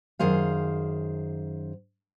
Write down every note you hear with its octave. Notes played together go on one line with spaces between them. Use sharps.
F#2 D#3 G#4 C5 F5